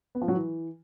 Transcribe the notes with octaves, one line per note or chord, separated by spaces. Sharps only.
B3
F3
F#3
E3